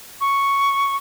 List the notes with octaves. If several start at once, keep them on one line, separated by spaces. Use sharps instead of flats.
C#6